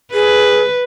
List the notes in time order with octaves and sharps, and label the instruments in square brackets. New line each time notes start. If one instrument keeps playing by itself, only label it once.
[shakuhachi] G#4 [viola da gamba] B4